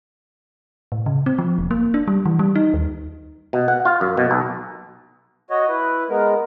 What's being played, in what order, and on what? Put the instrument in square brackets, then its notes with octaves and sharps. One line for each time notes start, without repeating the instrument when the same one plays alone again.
[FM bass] A2
C#3
C4
F3
E1
A#3
D4
G3
E3
G3
D#4
D#2
[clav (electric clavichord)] B2
F#5
F4
F#2
B2
B1
[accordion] F#4 C#5 D#5
E4 B4
G#3 B3 A#4